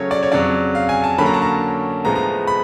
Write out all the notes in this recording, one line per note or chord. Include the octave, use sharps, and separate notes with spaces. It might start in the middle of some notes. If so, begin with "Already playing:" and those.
Already playing: C#3 F#3 A3 C#4 C#5
D5
C#5
F2 C#3 F#3 D5
F5
G#5
A5
D3 F#3 A#3 C#4 B5
A#5
A5
A#5
A2 F3 G#3 B3 A#5
A#5
B5